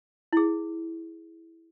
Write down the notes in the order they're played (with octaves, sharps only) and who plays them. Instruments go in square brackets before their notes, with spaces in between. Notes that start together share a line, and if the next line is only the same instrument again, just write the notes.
[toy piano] E4 G#4